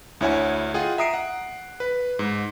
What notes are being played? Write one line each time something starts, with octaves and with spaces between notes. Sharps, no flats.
D2 E4 C#5 F#5 G#5
F4 G#4 D#5 F#5 G5
E5 A#5 D#6 C7 D7
F#5
B4
G#2